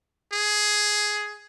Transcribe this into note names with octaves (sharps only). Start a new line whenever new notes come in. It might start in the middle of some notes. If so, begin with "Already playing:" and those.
G#4